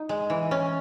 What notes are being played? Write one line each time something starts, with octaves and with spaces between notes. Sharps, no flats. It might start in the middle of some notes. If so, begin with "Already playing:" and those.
Already playing: D#4
G#3
E3
C#4